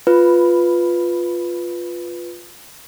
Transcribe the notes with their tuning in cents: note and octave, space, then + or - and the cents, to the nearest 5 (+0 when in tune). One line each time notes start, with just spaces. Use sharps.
F4 +0 B4 +0